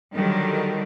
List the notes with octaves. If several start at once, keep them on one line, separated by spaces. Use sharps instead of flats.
D3 D#3 F#3 G3